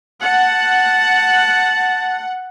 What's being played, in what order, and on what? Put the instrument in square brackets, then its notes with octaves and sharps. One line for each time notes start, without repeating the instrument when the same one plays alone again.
[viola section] F#5 [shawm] A5